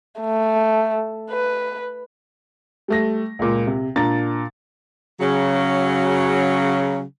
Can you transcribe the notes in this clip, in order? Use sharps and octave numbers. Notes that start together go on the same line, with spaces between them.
A3
B4
G3 A3 A#6
C#2 A#2
C3
A#2 D4 A#5 A6
C#3 F#3